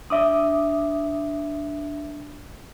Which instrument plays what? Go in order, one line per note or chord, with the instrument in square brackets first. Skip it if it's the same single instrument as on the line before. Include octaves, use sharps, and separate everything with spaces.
[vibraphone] D4 [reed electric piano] E5 D6 D#6